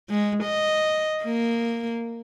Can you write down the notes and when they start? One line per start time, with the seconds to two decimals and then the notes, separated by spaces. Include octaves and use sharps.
0.10 G#3
0.44 D#5
1.24 A#3